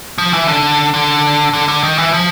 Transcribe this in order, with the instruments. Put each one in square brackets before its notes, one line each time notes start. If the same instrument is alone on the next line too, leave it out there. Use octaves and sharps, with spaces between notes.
[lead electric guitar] F3
E3
D3
D3
D3
D3
D#3
E3
F3